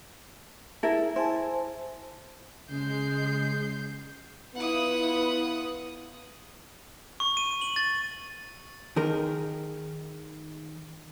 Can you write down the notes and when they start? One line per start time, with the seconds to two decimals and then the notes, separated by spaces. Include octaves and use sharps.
0.83 E4 G#4 A#4 A5
1.16 E4 C5 G#5 A5
2.70 C#3 G#3 G6 C7
4.55 B3 E4 F4 B4 F#5 D#6
7.20 C#6
7.37 D#7
7.61 F#7
7.76 A6
8.96 D#3 G#4 A#4